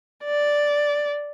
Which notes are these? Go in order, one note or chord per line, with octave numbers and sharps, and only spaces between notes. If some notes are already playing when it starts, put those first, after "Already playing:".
D5